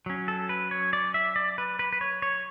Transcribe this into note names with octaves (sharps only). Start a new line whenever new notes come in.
F#3 C#4
A4
B4
C#5
D5
E5
D5
B4
B4
B4
C#5
C#5